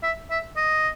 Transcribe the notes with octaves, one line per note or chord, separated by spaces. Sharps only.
E5
E5
D#5